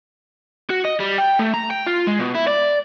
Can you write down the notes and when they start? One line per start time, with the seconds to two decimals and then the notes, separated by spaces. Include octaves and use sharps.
0.70 F#4
0.85 D#5
1.00 G3
1.18 G5
1.39 A3
1.54 A#5
1.71 G5
1.87 F4
2.07 G#3
2.19 B2
2.35 E4
2.48 D5